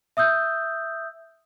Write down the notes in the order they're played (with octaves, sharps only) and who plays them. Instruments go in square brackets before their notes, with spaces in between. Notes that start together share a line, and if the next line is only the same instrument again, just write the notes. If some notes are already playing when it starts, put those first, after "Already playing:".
[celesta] E5 D#6 E6 G6